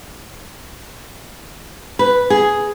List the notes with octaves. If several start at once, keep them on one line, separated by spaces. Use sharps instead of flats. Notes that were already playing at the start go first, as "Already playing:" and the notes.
B4
G#4